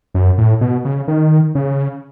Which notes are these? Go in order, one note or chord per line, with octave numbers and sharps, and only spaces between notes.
F#2
A2
B2
C#3
D#3
C#3